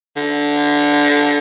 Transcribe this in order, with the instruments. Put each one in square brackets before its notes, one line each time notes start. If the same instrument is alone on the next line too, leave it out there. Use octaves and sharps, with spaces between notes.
[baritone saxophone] D3